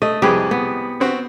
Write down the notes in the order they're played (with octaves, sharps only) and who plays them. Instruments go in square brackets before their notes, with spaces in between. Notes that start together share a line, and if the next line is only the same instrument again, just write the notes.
[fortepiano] A3 [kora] D#5
[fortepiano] C2 F2 B4 [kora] G4 G#4
[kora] B3
[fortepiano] B3 C4 F#4